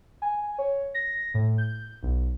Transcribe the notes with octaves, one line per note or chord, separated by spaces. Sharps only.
G#5
C#5
A#6
A2
G6
B1